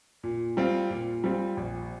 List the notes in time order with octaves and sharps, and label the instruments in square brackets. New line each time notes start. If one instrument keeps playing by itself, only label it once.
[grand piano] A#2
G3 C4 F4
A#2
G3 C4 F4
A#1